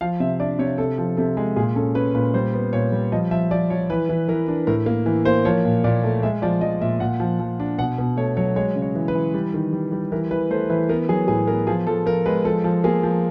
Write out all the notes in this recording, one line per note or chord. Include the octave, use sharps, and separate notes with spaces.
F3 F5
C3 E5
D4 D5
C3 C#5
C3 A4
F3
C3 A4
G#3
A#2 G#4
C#4 A4
C#4 B4
A#2 B4
G3 C5
B3
A#2 C#5
G3
F3 D#5
F3 E5
F3 D5
F3 C#5
E3 B4
E3
E3 A#4
D4
A2 A#4
A#3
E3
A#3 C5
F3 C#5
A#2
A#2 D5
A3
G#3 E5
F3 D5
F3 D#5
A#2 E5
A#2 F#5
F3
F3
D4
B2 F#5
B2
A3 C#5
F#3 C#5
G#3 C#5
C#3
C#5
E3
B4
E3
G3
D#3
G3
G3
E3 A#4
E3 B4
A3 C5
E3 B4
B3 A#4
F#3 G#4
A2 G#4
B3 A#4
F3 G#4
F3 A4
F3 A#4
G#3 B4
F3 A4
F3
A#3 G#4
F3